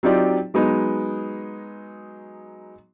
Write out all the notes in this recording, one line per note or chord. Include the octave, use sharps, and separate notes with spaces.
F#3 C4 D#4 F4 G4 D5
F#3 G#3 B3 D#4